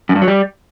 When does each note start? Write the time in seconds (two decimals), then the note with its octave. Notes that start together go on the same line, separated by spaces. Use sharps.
0.09 F#2
0.15 G2
0.22 F#3
0.28 G3